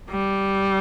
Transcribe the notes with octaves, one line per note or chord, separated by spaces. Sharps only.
G3